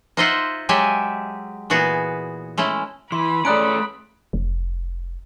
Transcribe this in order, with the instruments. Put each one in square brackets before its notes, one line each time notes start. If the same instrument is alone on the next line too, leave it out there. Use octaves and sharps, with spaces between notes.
[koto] D#4 F4 C5 D#5 E5 F#5
F#3 G#3 G4 E5 G#5 A5
A#2 E3 B3 F#4 G#4
G#3 A3 C#4 E4
[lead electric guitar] E3 [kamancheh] B5 [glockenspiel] C6
[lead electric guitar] A3 C#4 [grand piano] G#4 D5 A#5 [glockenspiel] D#6 F#6 D7
[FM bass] F1